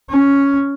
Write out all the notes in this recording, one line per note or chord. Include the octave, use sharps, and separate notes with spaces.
C#4